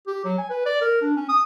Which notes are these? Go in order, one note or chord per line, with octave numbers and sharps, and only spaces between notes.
G4
F#3
G#5
B4
D5
A#4
D4
C#4
D#6